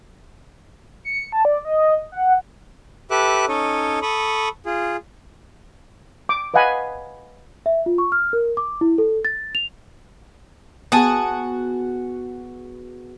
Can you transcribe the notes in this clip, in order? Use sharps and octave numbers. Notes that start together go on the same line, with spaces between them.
C#7
A5
D5
D#5
F#5
G4 A4 B4 E5 D6 F#6
C#4 D#4 A4 C#5 D#5
A4 B5 C#6 D#6
F4 G#4
D6
B4 D#5 F5 F#5 G#5 B5
E5
F4
C#6
F6
A#4
D6
E4
A4
A6
F7
B3 F#4 G#4 G#5 A5 D#6